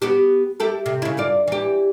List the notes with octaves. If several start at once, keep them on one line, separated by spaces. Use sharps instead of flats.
B3 F#4 G4
E4 G4 A4
C3
C#3 E4
G2 F4 D5
E3 G4